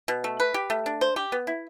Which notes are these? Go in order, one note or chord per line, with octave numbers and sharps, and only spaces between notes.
B2
A3
B4
G4
A3
D4
C5
G4
B3
E4